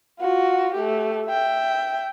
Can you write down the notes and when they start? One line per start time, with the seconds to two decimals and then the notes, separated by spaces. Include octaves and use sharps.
0.20 F4 F#4
0.74 A3 G4
1.27 E5 G5